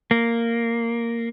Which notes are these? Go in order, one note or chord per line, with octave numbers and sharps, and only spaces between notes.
A#3